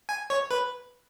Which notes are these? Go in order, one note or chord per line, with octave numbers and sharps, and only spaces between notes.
G#5
C#5
B4